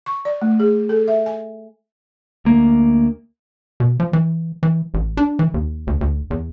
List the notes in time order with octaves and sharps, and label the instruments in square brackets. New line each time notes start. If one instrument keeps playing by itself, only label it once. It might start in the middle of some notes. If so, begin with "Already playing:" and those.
[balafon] C#6
D5
A3
G#4
A4
E5
G#5
[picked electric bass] D2 A#3
[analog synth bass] B2
F3
E3
E3
A1
D4
E3
D#2
D2
D2
E2